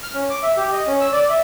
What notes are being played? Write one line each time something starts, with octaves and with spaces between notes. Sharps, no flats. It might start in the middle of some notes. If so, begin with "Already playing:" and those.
F6
C#4
D6
E5
G4
D#5
C#4
E6
D5
E5